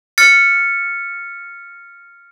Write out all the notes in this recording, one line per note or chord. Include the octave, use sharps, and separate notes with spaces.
F6 A6 C#7